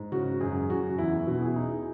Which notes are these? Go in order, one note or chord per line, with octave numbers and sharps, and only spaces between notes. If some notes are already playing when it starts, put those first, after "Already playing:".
Already playing: G#2
C#3 F#4
F#2 G#4
F#2 F#4
E2 E4
B2
G#4
D#4